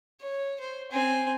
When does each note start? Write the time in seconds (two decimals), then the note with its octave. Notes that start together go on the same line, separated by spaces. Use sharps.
0.21 C#5
0.60 C5
0.91 C4 G#5